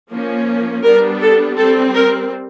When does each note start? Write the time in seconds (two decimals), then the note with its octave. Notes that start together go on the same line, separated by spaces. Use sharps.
0.11 F3 A#3 C#4
0.84 G3 B3 D4 A#4
1.21 A4
1.57 G3 C4 A4
1.94 A#4